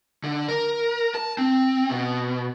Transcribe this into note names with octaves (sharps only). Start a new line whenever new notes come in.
D3
A#4
A5
C4
B2